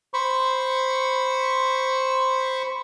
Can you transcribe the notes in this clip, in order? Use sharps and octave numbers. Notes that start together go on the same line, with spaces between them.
C5 B5 C#6